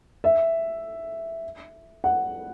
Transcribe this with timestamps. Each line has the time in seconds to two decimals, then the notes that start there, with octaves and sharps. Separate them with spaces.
0.24 E5
2.04 F#5